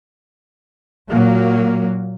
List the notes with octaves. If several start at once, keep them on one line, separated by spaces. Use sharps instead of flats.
A#2 F#3 A#3